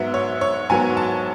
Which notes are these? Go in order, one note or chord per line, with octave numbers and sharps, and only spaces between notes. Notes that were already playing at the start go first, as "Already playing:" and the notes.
Already playing: G#2 F#3 B3 E5
C#5
C#5
G#2 F#3 B3 G#5
A5